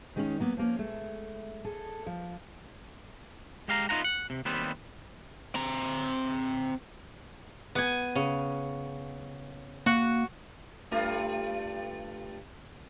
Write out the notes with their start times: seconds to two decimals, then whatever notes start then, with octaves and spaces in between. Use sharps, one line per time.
0.16 D#3 G#3 A#3 B3 C#4 D#4
0.40 F#3 A#3 B3
0.57 F3 A#3 C#4
0.79 G#3 A3
1.64 G#4 A4
2.06 F3
3.68 G#3 G4 F5 A#5
3.89 B3 D#4 F4 F#5 A#5
4.04 F#5
4.30 C3
4.45 D#2 G3 B3 C4
5.55 C4 A#5
7.75 B3 G#5
8.15 C#3
9.86 A#3 F#4
10.91 G2 A3 F4